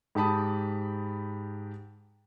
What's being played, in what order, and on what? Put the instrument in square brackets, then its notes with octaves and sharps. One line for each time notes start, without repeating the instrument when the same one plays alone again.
[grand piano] G#2 G4 A5 B5 D#6